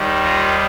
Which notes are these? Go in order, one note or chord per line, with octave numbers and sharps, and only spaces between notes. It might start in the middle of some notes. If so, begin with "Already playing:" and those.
Already playing: D#2 D#3 G3
F4 A#4